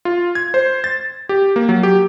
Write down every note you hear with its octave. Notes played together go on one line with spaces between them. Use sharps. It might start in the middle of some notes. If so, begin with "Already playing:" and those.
F4
G#6
C5
A6
G4
A#3
F#3
G4